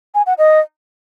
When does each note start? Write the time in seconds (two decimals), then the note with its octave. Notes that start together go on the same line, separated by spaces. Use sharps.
0.15 G#5
0.26 F#5
0.38 D#5